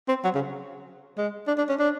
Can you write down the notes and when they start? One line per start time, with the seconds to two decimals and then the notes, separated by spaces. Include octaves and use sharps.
0.09 C4
0.24 F#3
0.35 C#3
1.18 G#3
1.48 D4
1.58 D4
1.69 C#4
1.79 D4